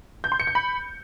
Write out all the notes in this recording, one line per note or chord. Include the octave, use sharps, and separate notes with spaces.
G6
C6
C#7
G6
B5